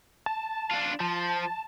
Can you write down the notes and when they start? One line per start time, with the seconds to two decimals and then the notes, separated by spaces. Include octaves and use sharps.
0.26 A5
0.71 D4 F4
1.00 F3 A5